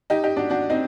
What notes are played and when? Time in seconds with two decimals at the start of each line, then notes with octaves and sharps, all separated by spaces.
0.10 D#4 G4
0.24 D#4 G4
0.36 D4 F#4
0.50 D4 F#4
0.70 C4 D#4